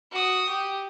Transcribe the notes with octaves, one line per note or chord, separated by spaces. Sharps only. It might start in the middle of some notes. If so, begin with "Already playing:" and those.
F#4 D#6
G4